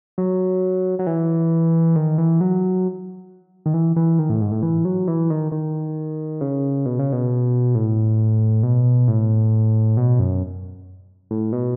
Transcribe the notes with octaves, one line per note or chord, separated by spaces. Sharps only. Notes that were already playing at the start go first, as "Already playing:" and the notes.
F#3
F#3
E3
D#3
E3
F#3
D#3
E3
E3
D#3
A2
G#2
A2
E3
F#3
E3
D#3
D#3
C#3
B2
C#3
B2
A2
B2
A2
B2
F#2
A2
B2